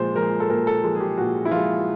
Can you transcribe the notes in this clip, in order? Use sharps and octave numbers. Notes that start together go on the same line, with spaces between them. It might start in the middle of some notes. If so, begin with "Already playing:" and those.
Already playing: A#2 F3 G#3 C5
F3 G#3 A#4
A4
A#2 A#4
A4
F3 G#3
G#4
G4
A#2 F#4
E4
F3 G#3 F4